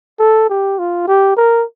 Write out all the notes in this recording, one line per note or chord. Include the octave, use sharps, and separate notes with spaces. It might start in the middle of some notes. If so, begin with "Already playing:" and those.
A4
G4
F4
G4
A#4